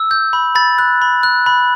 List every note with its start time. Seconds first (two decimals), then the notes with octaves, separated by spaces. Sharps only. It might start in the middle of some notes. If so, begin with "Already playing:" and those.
Already playing: E6
0.11 G6
0.33 B5
0.55 B5 A6
0.79 F#6
1.02 B5
1.23 F#6
1.46 B5